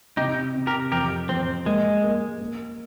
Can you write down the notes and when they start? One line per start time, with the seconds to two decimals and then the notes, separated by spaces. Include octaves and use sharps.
0.17 C3 D#4 G4
0.55 C3
0.67 G4 A#4
0.92 F2 G4 A#4
1.28 F2 C4
1.66 G#3 A#3
2.03 A#3
2.40 A#3